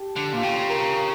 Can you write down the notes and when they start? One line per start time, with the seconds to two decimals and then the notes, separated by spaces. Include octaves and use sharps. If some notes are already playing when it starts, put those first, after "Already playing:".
Already playing: G4 A4
0.16 D3
0.33 A#2 F4
0.43 C#3 G4
0.70 A#4